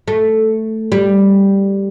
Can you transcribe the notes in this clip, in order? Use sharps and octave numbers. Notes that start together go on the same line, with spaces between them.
A3
G3